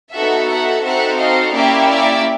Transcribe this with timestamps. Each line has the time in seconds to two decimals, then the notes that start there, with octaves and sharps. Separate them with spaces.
0.13 B3 D#4 F#4 A4 E5 F#5
0.48 E5 F#5
0.83 C4 D#4 F#4 A4 E5 F#5
1.18 D#5 F5
1.52 A#3 C#4 E4 G4 D5 E5
1.87 D5 E5